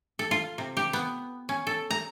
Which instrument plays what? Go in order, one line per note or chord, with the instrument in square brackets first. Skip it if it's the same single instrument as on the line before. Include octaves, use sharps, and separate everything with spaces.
[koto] A4
F4
C3
G4
B3
C#4
A4
A#5